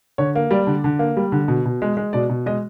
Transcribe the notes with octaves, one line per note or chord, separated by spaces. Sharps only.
D3 C#5
A#3
G3 D5
D3
D3
A#3
G3
D3
B2
B2
G#3
G#3
B2 D5
B2
G#3 D#5